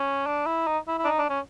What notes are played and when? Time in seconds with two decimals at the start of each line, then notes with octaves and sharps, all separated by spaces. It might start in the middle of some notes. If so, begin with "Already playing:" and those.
Already playing: C#4
0.26 D4
0.46 E4
0.67 D#4
0.88 E4
0.98 E4
1.04 D4
1.08 D#4
1.19 D4
1.29 C#4